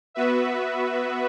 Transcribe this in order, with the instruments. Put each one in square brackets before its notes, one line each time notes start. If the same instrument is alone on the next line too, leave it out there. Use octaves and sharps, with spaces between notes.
[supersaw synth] B3 F#4 B4 E5